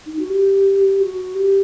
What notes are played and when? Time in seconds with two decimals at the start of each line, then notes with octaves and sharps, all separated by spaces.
0.06 D#4
0.19 F#4
0.30 G4
1.01 F#4
1.35 G4